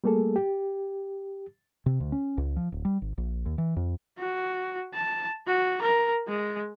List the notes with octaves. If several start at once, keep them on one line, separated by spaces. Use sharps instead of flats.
G3 A3 A#3 G#4 A4
G4
C3
D2
C#4
C#2
F3
D1
G3
G#1
A#1
D#2
E3
F2
F#4
A5
F#4
A#4
G#3